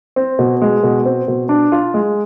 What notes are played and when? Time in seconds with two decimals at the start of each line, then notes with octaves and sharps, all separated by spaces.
0.16 C4
0.39 B2
0.62 G#3
0.83 B2
1.05 C4
1.28 B2
1.49 D4
1.72 F4
1.94 G#3